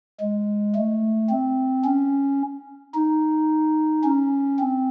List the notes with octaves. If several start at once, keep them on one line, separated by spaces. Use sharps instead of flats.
G#3
A3
C4
C#4
D#4
C#4
C4